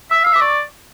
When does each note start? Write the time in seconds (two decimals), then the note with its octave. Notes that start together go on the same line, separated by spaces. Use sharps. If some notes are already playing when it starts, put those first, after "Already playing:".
0.11 E5 E6
0.24 F5 E6
0.33 E5 D6
0.41 D5 C#6